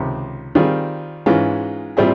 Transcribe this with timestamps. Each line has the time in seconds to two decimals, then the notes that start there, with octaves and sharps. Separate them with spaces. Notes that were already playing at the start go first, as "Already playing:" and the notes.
Already playing: C#2 C3 D#3
0.55 D#3 G3 C4 F4 G#4
1.26 G#2 E3 G#3 C#4 F4
1.97 A#2 G3 C4 E4 G#4